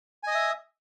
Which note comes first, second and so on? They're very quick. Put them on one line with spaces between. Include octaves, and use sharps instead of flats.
G#5 D#5 D#6 E5